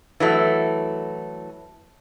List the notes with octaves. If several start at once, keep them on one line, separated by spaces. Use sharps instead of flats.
E3 F#3 A3